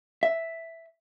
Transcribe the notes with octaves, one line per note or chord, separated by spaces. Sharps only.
E5